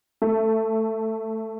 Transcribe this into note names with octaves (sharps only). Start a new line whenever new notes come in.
A3